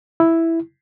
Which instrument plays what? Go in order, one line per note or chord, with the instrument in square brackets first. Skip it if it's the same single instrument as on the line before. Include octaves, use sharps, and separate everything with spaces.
[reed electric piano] E4